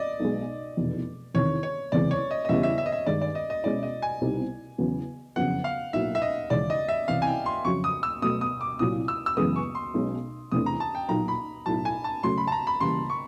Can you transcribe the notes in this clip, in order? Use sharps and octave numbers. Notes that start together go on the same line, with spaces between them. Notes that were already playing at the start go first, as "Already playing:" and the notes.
Already playing: D5 D#5
B1 B2 G#3
F1 E2 B2
E2 C3 D#3 C#5
C#5
F#1 E2 C3 E3 G#3 D5
C#5
D#5
D#5
E2 C#3 E3 G3 B3 E5
E5
E5
D#5
E5
G2 D#3 G#3 D5
D5
D#5
D#5
B2 G#3 C#4 E4 D5
D#5
G#5
C2 B2 G3 C4 D#4
E2 C#3 F#3 B3
F#1 F2 C#3 F#3 B3 F#5
F5
B1 A2 F#3 A#3 E5
E5
D#5
D#2 C#3 E3 G#3 C#4 D5
D#5
E5
C2 C3 E3 F5
G#5
G5
C6
F2 C#3 F#3 C#6
D#6
E6
B2 F#3 A3 D#6
D#6
D6
C2 A#2 F#3 D#6
E6
E6
F#2 C#3 E3 G#3 B3 D#6
C#6
C6
B1 B2 G#3 C#4
E2 C3 E3 A3 D4 D#6
A#5
A5
G5
B1 A#2 F#3 A#3 D#4 A#5
B5
B1 A2 F#3 A5
G#5
A5
C#3 F#3 A3 C6
B5
A5
A#5
B5
C#3 E3 G3 A#3 C6
C#6